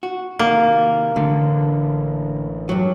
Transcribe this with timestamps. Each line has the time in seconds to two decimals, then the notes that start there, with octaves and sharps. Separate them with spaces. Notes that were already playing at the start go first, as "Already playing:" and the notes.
0.03 F#4
0.39 C3 D#3 A#3
1.16 A1 D3 A3 D4
2.69 G2 F#3